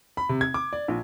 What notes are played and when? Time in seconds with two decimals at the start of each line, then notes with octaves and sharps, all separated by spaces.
0.17 B5
0.29 C3
0.41 G#6
0.54 D6
0.73 D5
0.88 A#1